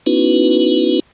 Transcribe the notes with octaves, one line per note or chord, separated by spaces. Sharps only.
B3 C#4 D#4 E4 F#4 B4